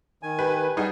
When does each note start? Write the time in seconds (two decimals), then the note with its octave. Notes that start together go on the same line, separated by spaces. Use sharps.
0.23 D#3 G#5
0.39 G4 B4
0.77 G3 D#4 G#4 F#5